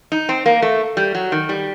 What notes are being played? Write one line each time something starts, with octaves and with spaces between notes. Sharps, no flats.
D#4
C4
A#3
A3
G3
F#3
D#3
G3